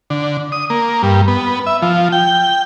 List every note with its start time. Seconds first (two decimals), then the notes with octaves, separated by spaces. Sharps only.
0.10 D3
0.52 D#6
0.70 A#3
1.03 G2
1.28 B3
1.67 E5
1.82 F3
2.12 G5